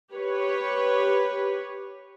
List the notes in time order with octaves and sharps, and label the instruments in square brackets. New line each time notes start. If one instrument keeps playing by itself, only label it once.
[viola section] G4 B4 C#5